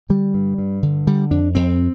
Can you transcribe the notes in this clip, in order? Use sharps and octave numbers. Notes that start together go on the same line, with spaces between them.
D3 G3
G2
G2
D3
D3 G3
F2 D4
F2 C4